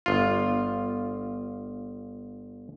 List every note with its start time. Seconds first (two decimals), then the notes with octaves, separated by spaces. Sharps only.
0.06 G1 F4